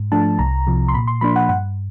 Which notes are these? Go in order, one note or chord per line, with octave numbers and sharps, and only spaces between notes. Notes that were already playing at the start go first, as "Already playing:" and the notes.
Already playing: G#2
F3 A3 D4 A5
C2 A#5
C3 F3
C6
A#2 B5
C6
F3 A#3 D4 B5
F#5
G2 F#5